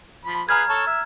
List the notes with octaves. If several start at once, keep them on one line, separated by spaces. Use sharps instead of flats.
F3 B5
G#4 B4 F5 A#5 F6 G#6
A4 C#5 A5
E5